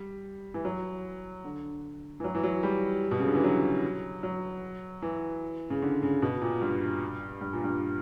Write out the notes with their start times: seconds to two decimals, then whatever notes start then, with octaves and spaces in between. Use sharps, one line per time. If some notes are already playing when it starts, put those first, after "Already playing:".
Already playing: G3
0.54 E3
0.65 F#3
1.44 D3
2.20 E3
2.24 F#3
2.35 E3
2.43 F#3
2.63 G3
3.11 B2
3.20 C#3
3.28 D3
3.35 E3
3.44 F#3
4.23 F#3
5.02 E3
5.70 C#3
5.82 D3
6.03 C#3
6.22 B2
6.41 A#2
6.61 G2
7.41 G2
7.53 A#2
7.64 G2